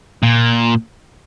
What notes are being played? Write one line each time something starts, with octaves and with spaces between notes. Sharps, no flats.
A#2